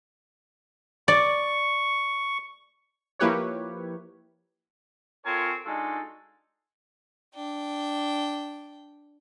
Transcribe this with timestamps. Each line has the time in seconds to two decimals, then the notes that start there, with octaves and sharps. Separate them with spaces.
1.08 D5 C#6
3.19 F3 A#3 E4 G4 B4 C#5
5.24 C4 F4 A4 A#4 C#5 G#5
5.64 G#3 D4 D#4 F4 F#4 A4
7.34 D4 G5